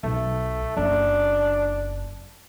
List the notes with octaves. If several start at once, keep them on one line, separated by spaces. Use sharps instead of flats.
B1 A3
F#1 D4